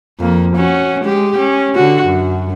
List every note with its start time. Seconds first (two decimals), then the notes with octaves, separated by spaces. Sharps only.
0.20 F2 A#3
0.56 C#4 F#4
1.04 G#3 G4
1.38 C#4
1.75 D3 F#4
2.06 F#2